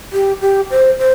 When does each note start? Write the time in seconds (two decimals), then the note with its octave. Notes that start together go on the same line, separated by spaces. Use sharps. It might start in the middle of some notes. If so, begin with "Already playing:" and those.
0.12 G4
0.41 G4
0.70 C5
0.99 C5